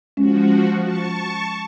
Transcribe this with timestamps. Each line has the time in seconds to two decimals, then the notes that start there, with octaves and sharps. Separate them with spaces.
0.17 F3 G#3 C#4 F#4
0.82 A5 C#6